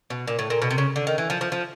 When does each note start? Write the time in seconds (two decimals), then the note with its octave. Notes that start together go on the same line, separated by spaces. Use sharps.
0.10 B2
0.27 A#2
0.39 A2
0.50 A#2
0.62 B2
0.71 C3
0.78 C#3
0.96 D3
1.07 D#3
1.18 E3
1.30 F3
1.41 F3
1.52 F3